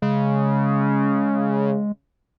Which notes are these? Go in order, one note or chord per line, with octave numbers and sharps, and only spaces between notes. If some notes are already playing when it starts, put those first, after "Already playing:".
C#3 G#3